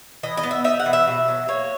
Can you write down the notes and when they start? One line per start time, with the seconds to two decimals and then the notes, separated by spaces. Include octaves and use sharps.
0.23 E3 D#5
0.37 D#5
0.43 B3
0.51 E5
0.64 D#4 E5
0.80 F#5
0.86 E3
0.93 E5
1.07 B2
1.28 F#3
1.48 A#3 C#5